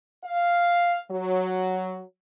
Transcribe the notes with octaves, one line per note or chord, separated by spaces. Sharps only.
F5
F#3